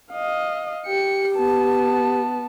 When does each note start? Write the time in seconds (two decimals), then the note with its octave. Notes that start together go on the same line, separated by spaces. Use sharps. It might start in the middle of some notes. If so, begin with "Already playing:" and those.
0.12 D#5 F5
0.87 G4 G5 C#7
1.36 B3 A5